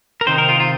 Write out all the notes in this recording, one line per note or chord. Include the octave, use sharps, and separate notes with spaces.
A#4
C3 D#3 C4 D#4 C5
A#4
F4
F4